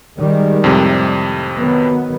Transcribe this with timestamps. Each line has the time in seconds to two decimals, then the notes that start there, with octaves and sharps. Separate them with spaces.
0.19 D#3 G3 G#3
0.64 F2 A2 C3
1.59 D#3 F#3 B3